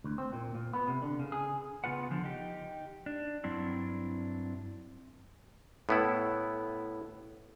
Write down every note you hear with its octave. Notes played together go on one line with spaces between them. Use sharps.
D2
C4
A#2
A#2
B3
C3
D3
C#3
G#4
C#3 B3 F4 B4 F#5
D3 F3
D#4 G4
D4
G2 F#3 C4 D4 E4
A2 B3 E4